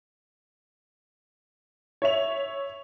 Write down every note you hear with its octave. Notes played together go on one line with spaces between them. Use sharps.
C#5 E5 F7